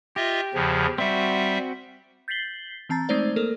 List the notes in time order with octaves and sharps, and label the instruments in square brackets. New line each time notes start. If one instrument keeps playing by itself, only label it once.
[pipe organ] F4 D#5 E5 [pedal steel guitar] G4
[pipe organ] E2 C#3 F3
[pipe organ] G3 E5 [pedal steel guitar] C4 F#4
[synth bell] G6 A6 B6 C7 F#7 G7
E3 C4 A5 A#5 A6
G#3 A3 C4 D#4 C5 D5
A#3 A4 A#4 A#6